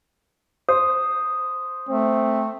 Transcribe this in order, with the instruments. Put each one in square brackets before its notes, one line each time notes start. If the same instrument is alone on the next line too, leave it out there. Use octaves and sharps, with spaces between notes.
[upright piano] C5 [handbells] D#6
[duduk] A3 [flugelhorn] C4